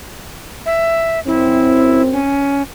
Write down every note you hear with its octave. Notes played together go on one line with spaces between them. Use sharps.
E5
F#2 C4 E4
C#4